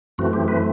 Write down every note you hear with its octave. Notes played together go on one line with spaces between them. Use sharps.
F#2 E3 A3 C4 F#4
G4
B4